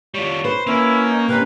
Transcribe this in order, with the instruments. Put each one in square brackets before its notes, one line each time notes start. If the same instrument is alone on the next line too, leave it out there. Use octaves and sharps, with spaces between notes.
[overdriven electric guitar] G3 F4 [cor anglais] C#5
[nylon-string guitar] B4 [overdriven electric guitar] C5
[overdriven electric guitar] A#3 [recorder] C#4 [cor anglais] E4
[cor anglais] D#4
[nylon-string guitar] C3 C#4 [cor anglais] A#4 [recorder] B4